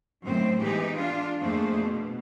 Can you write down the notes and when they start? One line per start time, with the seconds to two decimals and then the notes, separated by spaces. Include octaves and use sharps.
0.23 F#2 A2 D#3 C4 C5
0.61 E3 G#3 B3 D#4 G4 G#4
0.98 D4 F4
1.42 F2 A3 A#3 D4 G#4 C5
1.81 B2